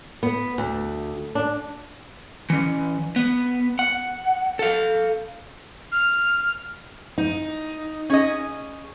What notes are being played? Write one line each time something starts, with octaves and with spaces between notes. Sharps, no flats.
B3
D2
D4
E3 C#4
B3
F#5
A4 F5
F6
D#4
C#4 G#4 D#5